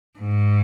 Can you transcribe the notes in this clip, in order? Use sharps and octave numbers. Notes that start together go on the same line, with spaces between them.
G#2